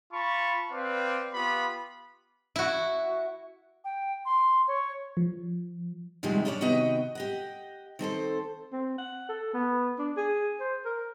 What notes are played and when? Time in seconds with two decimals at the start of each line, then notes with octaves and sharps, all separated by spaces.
0.12 F4 A5 B5 C#6
0.71 C4 B4 D5 F5
1.34 B3 F4 G4 B5
2.56 E4 F#4
3.84 G5
4.25 C6
4.68 C#5
5.17 F3
6.23 F#2 C3 D#3 F3 G3 G#3
6.45 C#4 D4 G4 B4 C#5 D5
6.61 C3 D#3 B3 F#4 D#5 G5
7.15 G4 D#5 F#5
7.99 D#3 C4 A4 C5
8.72 C4
8.98 F#5
9.29 A4
9.53 B3
9.99 D4
10.17 G#4
10.60 C5
10.85 A#4